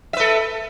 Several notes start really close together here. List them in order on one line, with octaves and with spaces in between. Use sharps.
E5 B4 A4